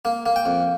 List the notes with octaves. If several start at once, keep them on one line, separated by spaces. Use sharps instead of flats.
A#3
A#3
G5
F2